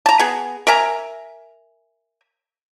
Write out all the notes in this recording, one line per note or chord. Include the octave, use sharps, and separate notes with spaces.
A5 A#5
B3 G#4
A#4 E5 G#5 A#5